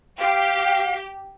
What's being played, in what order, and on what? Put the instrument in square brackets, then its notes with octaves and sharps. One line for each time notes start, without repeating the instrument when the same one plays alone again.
[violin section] G4 [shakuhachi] F5